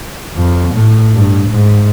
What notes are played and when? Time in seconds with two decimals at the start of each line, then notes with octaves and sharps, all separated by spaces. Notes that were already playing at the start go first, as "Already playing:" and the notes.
0.36 F2
0.74 A2
1.14 G2
1.49 G#2